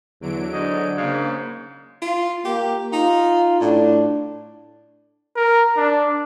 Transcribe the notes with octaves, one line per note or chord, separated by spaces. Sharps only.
E2 D3 F#3 D7
G#2 D4 D#5
G#2 C#3 A#3 F5
F4
A#3 G4
D#4 F4
A2 D4
A#4
D4